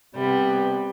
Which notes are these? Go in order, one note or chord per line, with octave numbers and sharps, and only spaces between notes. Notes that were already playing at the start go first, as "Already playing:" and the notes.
C3 G3 B3